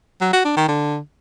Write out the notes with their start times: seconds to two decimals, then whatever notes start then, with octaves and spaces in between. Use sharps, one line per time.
0.21 F#3
0.33 F#4
0.45 D4
0.57 D#3
0.68 D3